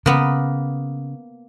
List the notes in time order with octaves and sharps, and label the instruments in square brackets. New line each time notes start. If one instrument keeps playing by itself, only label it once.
[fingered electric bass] C#3 [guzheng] A#3 B3